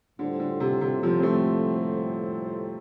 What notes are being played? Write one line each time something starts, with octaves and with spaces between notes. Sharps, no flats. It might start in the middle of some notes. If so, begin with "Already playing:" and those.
A2 D3 G3 F4 A4 C5
D3
C3
C3
C3 F3
C4
F3 A3